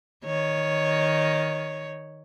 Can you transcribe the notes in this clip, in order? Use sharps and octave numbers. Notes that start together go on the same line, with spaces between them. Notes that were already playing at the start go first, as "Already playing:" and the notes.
D#3 C#5